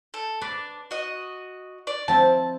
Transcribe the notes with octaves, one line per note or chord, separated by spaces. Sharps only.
A4
D4 B4 D6
F#4 D#5
D5
F3 C4 E4 A5